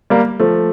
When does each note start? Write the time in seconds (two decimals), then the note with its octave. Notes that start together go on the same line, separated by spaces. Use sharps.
0.10 G3 A#3
0.39 F3 A3